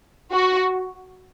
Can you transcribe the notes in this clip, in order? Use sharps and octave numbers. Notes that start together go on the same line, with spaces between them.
F#4